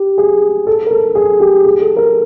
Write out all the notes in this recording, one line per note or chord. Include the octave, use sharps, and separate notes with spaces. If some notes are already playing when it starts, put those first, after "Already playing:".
Already playing: G4
G#4
A4
A#4
A4
G#4
G4
G#4
A4
A#4